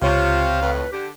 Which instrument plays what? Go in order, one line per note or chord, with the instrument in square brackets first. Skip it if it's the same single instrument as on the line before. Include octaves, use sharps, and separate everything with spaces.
[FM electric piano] C#2 C#5 C#6 [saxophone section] C3 [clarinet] F4 [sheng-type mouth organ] F5
[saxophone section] F2 A2 [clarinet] B4
[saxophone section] D3 [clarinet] G4